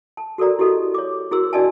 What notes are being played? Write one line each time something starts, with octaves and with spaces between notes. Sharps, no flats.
A5
F#4 A4 A#4 D5 A#5
E4 F#4 G4 A4 D#5
C#5 D6
E4 F#4 G#4 A#4 C5 E6
D4 F#4 D5 D#5 G#5 A5